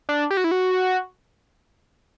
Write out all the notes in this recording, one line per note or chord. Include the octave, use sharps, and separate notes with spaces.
D4
G4
F#4
E4
F#4